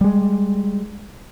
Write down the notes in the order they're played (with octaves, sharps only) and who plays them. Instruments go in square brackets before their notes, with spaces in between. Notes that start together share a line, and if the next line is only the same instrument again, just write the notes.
[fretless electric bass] G3 G#3